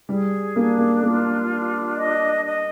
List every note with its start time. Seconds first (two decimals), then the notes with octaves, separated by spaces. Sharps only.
0.08 G3 G#4
0.55 A#3 D4
0.79 A#3
1.03 A#3 F4
1.50 D4
1.97 D#5
2.44 D#5